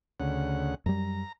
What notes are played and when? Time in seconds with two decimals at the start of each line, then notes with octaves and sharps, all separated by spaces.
0.20 D2 C#3 F#5
0.86 F#2 G3 A#5